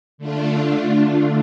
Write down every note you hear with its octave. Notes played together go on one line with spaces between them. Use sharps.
D3 A3 D4 F4